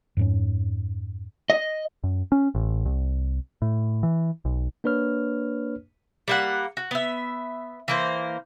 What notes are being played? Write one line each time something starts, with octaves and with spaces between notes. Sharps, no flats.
F2 G#2 C#4
D#5
F#2
C#4
A1
C2
A2
E3
B1
A#3 D4 B4 C#5 F6
G3 A#3 F#5
F#4
B3 E5
E3 A#3 C5